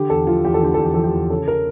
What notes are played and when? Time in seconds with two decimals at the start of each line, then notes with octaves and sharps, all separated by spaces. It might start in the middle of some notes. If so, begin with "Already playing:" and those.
Already playing: D3 G4
0.10 E2 A4
0.27 F3 F4
0.44 E2 G4
0.54 A4
0.62 D3 G4
0.74 E2 A4
0.84 G4
0.94 F3 A4
1.04 G4
1.13 E2
1.30 C#3 A4
1.48 A#4